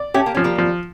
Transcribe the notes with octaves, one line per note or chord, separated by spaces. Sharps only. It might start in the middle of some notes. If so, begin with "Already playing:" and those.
Already playing: D5
A3 C#4 G4
A#3
F3 C#4
G3 A#3
F3